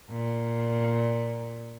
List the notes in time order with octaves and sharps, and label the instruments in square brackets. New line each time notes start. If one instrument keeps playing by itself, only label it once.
[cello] A#2